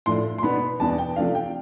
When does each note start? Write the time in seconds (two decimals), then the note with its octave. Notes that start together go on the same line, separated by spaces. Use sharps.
0.06 A2 F3 A3 D4 C6
0.38 C6
0.43 B2 B3 D4 B5
0.80 E2 B2 B3 D4 A5
0.98 G5
1.16 C3 F3 A3 D4 F5
1.35 G5